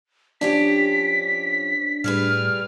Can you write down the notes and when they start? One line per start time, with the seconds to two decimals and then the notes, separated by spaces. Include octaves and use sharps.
0.41 F3 C#4 D4 G4 B6
2.04 A2 G3 G#4 B4 F6